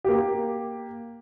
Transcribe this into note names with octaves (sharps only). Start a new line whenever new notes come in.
A#3 G4